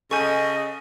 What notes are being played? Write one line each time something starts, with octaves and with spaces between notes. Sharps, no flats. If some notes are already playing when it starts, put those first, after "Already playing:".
C#3 A4 D#5 G#5 C#6 G6 D#7